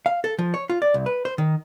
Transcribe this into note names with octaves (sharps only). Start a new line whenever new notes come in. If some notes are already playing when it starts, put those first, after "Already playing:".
F5
A4
F3
C#5
F4
D5
C2
B4
C5
D#3